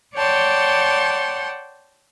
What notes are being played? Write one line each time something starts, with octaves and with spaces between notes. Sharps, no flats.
C#5 D5 F#5 G5 A5 C6